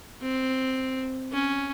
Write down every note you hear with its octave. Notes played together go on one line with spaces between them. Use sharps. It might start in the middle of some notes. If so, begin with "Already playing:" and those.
C4
C#4